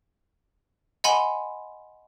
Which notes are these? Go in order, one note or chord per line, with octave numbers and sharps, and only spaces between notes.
D#5 F#5 G#5 B5 C6